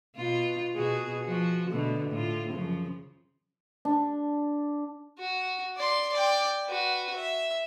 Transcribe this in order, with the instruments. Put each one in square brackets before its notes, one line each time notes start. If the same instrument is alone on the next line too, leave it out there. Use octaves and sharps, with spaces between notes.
[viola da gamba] B2 F4
B2 F#4 G#4
F3 F#4
B2 D3 A3
A2 F4
F#2 C#3 F3
[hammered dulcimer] D4
[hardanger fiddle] F#4
D5 C6
D5 G5
F#4 B4
E5